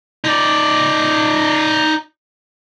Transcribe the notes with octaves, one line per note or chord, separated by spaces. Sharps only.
D#4 D5